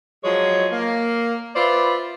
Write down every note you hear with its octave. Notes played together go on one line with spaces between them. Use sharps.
F3 F#3 G#3 C#5
A#3
F4 B4 C5 D5 E5